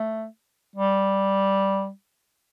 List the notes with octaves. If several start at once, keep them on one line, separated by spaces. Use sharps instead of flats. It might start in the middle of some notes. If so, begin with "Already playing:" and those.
Already playing: A3
G3